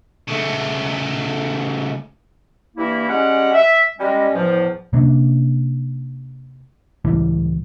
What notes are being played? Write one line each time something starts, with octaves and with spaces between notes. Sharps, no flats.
C#3 A3
G2 E3 A#3 E4
G3 G#3 C#4 G4 F#5
E5
G3 G#3 C#4
E2 A2 F3
C3 A#3 C#4 D4
C#2 A2 E3 G3